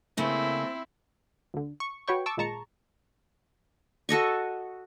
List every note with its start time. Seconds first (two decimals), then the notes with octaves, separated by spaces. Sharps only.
0.17 C#3 A3 A#3 C4 E4
1.54 D2 D3
1.80 C#6
2.08 F#4 B4 C#5 G5 C#6
2.26 A5 C#6 D6 E6
2.37 G#1 A#2 G#3 A5 A#5 C#6
4.09 F#4 A4 D#5 C#6